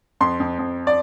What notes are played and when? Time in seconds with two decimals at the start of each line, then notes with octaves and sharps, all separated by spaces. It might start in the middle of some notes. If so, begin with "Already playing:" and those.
0.21 F2 C6
0.40 F2
0.58 F2
0.87 D5